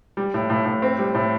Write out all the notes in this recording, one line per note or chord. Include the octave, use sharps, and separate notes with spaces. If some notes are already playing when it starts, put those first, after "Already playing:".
G3
A2
A2
A2
C4
G3
A2